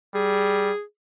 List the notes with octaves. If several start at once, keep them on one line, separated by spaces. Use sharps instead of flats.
G3 G#4